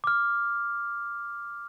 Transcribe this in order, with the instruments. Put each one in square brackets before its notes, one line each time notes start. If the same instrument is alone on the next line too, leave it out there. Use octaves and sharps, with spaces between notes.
[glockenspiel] D6 F6